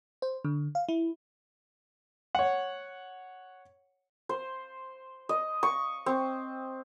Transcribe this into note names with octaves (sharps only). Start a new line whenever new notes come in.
C5
D3
F5
E4
C#5 F#5
C5
D#5
C#6
C4